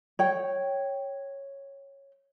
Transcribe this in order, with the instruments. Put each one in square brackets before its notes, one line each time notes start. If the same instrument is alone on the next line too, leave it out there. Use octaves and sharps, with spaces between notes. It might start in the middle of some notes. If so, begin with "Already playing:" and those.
[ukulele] C#5 G5